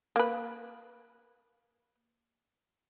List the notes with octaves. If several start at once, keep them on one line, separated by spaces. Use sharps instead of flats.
A#3 B4